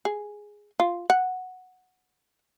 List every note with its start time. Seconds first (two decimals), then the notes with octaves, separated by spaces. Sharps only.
0.05 G#4
0.80 F4
1.10 F#5